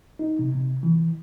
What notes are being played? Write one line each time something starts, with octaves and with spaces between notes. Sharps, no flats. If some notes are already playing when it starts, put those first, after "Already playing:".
D#4
C3
C3
E3